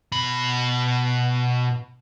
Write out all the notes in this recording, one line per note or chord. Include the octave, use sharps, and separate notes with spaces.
B2 B5